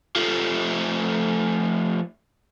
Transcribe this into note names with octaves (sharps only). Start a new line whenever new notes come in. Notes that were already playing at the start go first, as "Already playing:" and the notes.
F3 A3